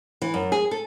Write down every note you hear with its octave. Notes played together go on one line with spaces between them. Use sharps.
E3
F#2
G#4
A4